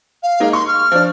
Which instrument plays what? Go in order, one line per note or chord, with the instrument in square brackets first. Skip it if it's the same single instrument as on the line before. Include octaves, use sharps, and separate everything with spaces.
[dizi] F5
[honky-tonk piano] G#3 A#3 D#4
[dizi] C6 [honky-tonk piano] C#6
[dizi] F6
[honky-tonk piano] F3 D4